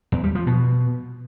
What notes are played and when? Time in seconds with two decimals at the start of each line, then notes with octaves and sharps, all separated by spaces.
0.12 E2
0.24 G3
0.35 F3
0.47 B2